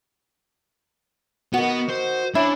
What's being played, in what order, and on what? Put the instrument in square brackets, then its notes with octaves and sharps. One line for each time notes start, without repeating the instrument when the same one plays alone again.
[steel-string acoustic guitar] D#3 F#4 [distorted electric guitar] B3
[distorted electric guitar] C5
[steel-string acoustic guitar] C#4 [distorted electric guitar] D4 [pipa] E4